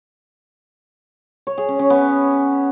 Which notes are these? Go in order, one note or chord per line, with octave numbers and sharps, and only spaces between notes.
C#5
G#4
C#4
C#4
B3